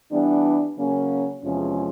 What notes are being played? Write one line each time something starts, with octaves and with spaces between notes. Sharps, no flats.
E3 G3 B3 D4
C#3 F#3 A#3 C#4
E2 C3 F3 G#3 C#4